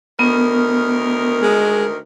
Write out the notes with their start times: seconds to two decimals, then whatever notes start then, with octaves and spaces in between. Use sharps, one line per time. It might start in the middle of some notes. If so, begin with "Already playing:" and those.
0.19 D2 D#3 B3 A#4
1.42 G#3